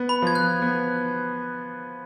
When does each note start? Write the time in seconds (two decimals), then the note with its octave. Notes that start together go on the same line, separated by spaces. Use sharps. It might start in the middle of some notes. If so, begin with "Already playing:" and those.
Already playing: B3
0.09 B5
0.22 F3 G#6
0.35 F#6
0.62 B3